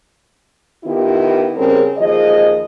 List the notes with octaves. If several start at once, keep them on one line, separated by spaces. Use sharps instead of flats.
D#3 B3 E4 F4 G4
C#3 G3 C4 C#4 G#4 A#4
D#2 F3 G#4 D#5